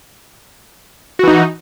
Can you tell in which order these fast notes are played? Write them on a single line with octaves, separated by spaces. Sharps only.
F#4 E3 D#4